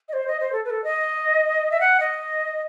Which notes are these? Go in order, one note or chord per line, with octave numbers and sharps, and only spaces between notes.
D#5
C5
D#5
C5
A4
B4
A4
D#5
E5
F#5
D#5